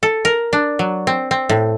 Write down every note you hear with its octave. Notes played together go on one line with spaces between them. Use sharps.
A4
A#4
D4
F#3
C4
C4
A2